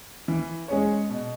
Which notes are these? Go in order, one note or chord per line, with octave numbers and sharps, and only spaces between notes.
E3
G#3 C#4 G#4 C#5
B2